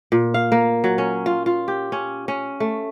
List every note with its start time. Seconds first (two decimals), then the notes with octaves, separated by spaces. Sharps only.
0.12 A#2
0.34 F5
0.52 A#3
0.84 F#3
0.98 C#4
1.26 F4
1.46 F4
1.68 G4
1.92 C#4
2.28 C#4
2.60 A3